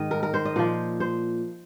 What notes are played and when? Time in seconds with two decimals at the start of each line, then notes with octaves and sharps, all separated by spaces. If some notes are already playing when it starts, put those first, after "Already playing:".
Already playing: G#2 D#3 D#5
0.11 A#4
0.23 A#4
0.34 C5
0.45 D#5
0.56 A#2 F3 C5
1.00 C5